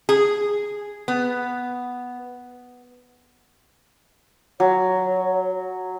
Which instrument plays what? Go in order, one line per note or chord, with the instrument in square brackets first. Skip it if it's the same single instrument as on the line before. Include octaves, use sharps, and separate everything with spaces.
[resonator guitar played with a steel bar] G#4
B3
[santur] F#3 [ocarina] C#5